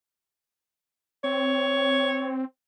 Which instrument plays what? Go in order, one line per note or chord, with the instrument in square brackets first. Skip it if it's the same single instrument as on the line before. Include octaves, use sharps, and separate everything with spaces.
[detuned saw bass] C4 [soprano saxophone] C#5